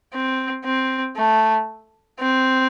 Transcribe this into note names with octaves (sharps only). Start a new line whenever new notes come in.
C4
C4
A3
C4